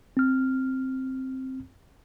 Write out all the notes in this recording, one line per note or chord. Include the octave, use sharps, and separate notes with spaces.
C4 F6